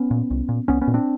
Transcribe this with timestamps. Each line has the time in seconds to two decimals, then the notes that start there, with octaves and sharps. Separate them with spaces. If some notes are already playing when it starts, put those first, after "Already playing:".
Already playing: B3 C#4
0.11 A#2
0.31 C2
0.49 A#2
0.68 C2 B3 C#4
0.81 B3 C#4
0.88 A#2
0.94 C4 D4